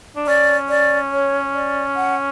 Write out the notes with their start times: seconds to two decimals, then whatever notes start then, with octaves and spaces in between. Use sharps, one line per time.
0.16 D4
0.27 C#4 D5
0.69 D5
1.12 C#5
1.54 D5
1.96 F#5